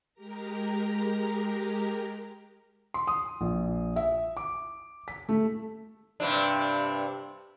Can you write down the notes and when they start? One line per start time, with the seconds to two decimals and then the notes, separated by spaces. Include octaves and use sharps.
0.14 G#3 G4 A#4 A#5
2.94 C6
3.07 D#6
3.41 A#1
3.96 E5
4.37 D6
5.08 B6
5.29 A3
6.20 G2 C3 D4